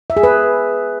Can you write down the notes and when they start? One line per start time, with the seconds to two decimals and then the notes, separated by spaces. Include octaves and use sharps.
0.10 E5
0.17 G#4
0.23 B4